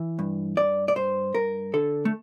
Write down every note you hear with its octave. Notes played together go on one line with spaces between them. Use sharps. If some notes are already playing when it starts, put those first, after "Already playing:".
Already playing: E3
G2
G2 D5
D5
G2 C5
G2 A#4
D3 A4
A3